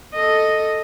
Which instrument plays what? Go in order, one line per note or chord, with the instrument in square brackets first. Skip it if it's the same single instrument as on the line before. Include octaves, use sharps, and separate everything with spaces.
[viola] A4 D#5